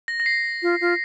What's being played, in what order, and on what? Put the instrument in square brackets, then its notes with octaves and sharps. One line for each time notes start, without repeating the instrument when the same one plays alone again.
[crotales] A#6
A#6
C7
[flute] F4
F4